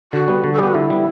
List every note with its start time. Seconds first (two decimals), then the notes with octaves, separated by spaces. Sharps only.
0.13 D3 F#4
0.28 G3 B3
0.44 D3
0.53 A4
0.59 G3 G4
0.63 B3 F#4
0.74 D3 E4
0.90 G3 B3